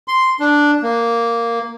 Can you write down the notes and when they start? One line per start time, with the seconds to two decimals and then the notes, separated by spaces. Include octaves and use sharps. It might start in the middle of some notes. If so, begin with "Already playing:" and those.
0.08 C6
0.40 D4
0.83 A#3